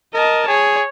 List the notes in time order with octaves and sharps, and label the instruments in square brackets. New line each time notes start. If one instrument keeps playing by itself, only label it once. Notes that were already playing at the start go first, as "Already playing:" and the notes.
[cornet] A#4 [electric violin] D#5 A5
[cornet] G#4 [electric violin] C#5